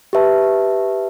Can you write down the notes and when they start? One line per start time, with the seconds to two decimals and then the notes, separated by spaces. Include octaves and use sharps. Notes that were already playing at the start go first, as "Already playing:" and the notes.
0.13 G4 B4 E5 A5